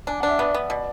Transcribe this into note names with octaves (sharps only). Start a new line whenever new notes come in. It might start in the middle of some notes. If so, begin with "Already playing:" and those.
D4 G#5
F#5
D4 E5
B3 D5
B3
B2 D5